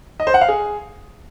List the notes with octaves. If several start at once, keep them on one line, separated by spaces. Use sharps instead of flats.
D#5
C5
F#5
F5
G#4